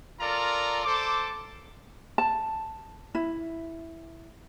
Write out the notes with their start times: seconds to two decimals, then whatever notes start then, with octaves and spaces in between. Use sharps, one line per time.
0.20 F4 A4 A#4 D5 A#5
0.85 A4 C5 D6
2.18 A5
3.15 E4